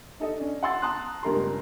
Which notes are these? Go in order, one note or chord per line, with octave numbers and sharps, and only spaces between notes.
D#4 A4 D#5
C#4 D4
F#5 A5 C6 E6 A6
A5 A#5 C6 D#6 F#6
C#2 G2 C#4 A#4 A#5 C6